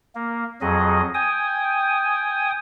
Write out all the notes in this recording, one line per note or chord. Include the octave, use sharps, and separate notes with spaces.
A#3
F2 F#3 G#4 D#5
G5 G#5 D#6